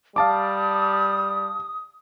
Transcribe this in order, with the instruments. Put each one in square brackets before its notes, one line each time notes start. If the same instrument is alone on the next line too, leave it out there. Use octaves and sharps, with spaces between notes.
[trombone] G3 [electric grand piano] F5 A5 D6 [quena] D#6